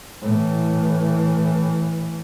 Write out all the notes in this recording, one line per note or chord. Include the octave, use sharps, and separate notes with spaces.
A2 E3